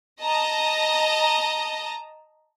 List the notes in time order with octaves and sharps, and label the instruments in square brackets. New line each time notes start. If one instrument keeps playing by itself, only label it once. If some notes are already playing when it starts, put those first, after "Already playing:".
[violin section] D#5 A5 A#5 A#6